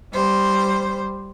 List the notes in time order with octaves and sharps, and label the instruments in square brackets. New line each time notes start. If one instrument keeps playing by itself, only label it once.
[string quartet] G3 C5